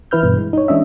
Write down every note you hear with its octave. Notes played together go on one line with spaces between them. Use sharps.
E3 E4 B4 F6 G6
G2 B2 E3
G#3
D#4 C#5
E3 G#3 C#4 D4 D#5 E5